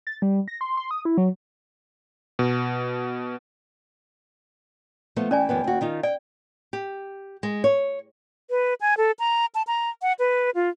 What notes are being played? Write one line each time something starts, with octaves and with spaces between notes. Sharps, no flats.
A6
G3
A#6
C6
C6
D#6
E4
F#3
B2
F3 A3 B3
E3 C#4 D5 G5 G#5
F#2 E3 B3
D#2 F#4
D#3 D#4 F4
D5 G5
G4
G#3
C#5
B4
G#5
A4
A#5
A5
A#5
F#5
B4
F4